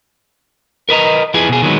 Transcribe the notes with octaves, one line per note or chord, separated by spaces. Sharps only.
A#4 B4 D#5 A#5
F3 E4 G#4 B4 G#5
B2 G#4
D#3 F#3 G#3 B3